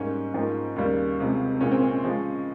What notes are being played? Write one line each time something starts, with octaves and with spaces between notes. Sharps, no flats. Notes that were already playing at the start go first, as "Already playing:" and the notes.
Already playing: G#2 G3 A#3 C#4
G#2 F3 A#3
D#2 C#3 G3 A#3
C#2 C3 F3 G#3
C2 A#2 G#3 C#4
C4
C#4
C#3 F3 G#3